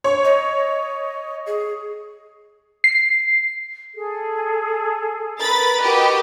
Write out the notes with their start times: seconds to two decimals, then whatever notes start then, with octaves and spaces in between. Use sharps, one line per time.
0.04 C#5
0.24 D#5
1.46 G#4
2.84 C7
3.95 G#4 A4
5.40 A#4 B4 B5 A6
5.82 F#4 G4 D#5